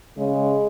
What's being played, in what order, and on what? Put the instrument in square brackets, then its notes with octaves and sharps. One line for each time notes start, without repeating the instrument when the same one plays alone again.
[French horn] C#3 [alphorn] G#3